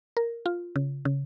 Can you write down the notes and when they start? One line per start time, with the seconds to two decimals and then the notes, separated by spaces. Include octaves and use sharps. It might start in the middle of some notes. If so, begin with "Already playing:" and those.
0.17 A#4
0.46 F4
0.76 C#3
1.05 C#3